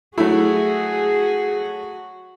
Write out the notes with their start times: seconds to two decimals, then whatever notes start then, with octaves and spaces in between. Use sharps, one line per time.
0.18 F#3 A3 E4 F#4 G#4